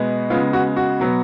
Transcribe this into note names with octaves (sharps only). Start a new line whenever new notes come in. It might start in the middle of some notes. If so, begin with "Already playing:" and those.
Already playing: B2 G#3 B3
C#3 G#3 B3 F4
F#4
F#4
B2 F#3 B3